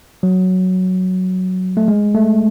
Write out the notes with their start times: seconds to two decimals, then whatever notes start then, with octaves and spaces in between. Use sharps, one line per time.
0.23 F#3
1.77 A3
1.88 G#3
2.15 A3